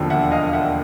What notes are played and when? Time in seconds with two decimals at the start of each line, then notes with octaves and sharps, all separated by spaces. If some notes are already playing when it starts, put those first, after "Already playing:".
Already playing: E1 D#2 D3 F3
0.10 E5 F#5
0.31 D#5 F5
0.53 E5 F#5